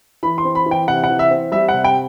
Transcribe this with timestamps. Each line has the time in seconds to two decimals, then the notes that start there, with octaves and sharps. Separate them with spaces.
0.23 E3 B5
0.38 C6
0.45 C4
0.55 B5
0.66 E3
0.71 G5
0.87 C3 F#5
1.04 F#5
1.09 E3
1.19 E5
1.31 C4
1.52 G3 E5
1.69 F#5
1.74 C3
1.84 G5